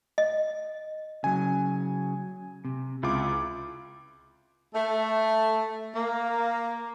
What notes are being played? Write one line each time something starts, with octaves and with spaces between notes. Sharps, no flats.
D#5
C#3 F#3 G#5
C3
C#2 E4 F4 D6
A3
A#3